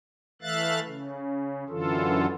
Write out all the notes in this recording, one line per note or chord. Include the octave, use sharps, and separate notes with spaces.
E3 A3 E5 F5 F#6 A6
C#3
F#2 D3 E3 F4 A4